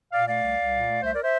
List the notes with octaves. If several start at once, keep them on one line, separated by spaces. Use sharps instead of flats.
A#2 D5 F5
A3 D5 F5
C2
C2
A#2
A3
C2 C5 E5
A#4 D5
C5 E5